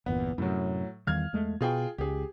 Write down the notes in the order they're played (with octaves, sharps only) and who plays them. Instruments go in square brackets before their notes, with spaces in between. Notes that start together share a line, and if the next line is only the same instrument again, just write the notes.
[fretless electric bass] G1 E2 A#2 [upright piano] B3
[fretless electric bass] F#2 C3 [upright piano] A2 F#3
[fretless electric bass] E2 D#3 G3 [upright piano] F5 F6 G#6
[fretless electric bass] E2 G#3 A3
[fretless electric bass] B2 [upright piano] F4 G#4 G5
[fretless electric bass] C#2 [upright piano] G4 G#4